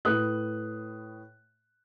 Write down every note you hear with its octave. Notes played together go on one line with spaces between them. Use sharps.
A2 B4 D#6 F#6